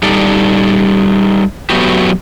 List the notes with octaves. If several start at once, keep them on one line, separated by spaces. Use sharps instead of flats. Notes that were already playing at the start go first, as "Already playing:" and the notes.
G3 D#4 A4 D5
F#3 A3 B3 F#4 G4